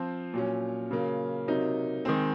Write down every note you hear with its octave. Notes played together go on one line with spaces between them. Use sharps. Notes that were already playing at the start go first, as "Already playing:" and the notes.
Already playing: F3 C4 F4
A#2 F#3 C#4
C#3 F#3 A#3
C3 F#3 A#3 D#4
D#3 G#3 C4